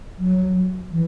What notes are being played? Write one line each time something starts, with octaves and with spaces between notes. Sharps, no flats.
F#3
E3